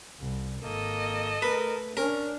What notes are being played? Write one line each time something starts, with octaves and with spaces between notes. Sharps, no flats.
C2
G#1 A#3 A4 D#5
A3 A#4 B4
C#4 D4 A#4